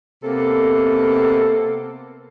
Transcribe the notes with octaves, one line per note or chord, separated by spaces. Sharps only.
C3 A#3 B3 A4